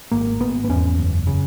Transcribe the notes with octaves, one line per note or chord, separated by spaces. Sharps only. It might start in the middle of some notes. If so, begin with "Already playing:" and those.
G#1 A#3
G#1 B3
B3
E2 C#4
F#1
C#3